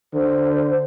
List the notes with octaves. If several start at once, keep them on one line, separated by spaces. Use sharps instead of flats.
D3 C5